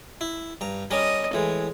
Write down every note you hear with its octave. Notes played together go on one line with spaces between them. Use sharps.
E4
G2 A#5
G3 C#4 A#4 D#5
A2 E3 G#3